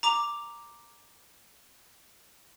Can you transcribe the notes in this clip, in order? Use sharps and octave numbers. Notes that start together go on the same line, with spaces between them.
A#5 D6 F7